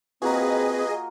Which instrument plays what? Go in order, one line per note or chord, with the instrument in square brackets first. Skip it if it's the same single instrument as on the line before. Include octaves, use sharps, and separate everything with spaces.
[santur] A#3 F4 F#4 [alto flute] C4 [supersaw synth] G#4 D#5 [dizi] B4